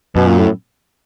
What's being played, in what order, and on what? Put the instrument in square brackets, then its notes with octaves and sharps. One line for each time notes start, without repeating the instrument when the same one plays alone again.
[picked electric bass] F#2 [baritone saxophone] B2
[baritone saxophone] A#2
A2